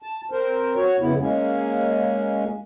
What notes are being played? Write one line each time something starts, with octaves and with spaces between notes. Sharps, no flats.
A5
C4 A#4 C5
F#4 C#5
F2 C#3 B3 E4
G#3 A#3 C#4